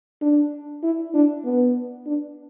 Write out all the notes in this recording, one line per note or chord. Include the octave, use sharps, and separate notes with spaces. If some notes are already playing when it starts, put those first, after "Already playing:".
D4
E4
D4
B3
D4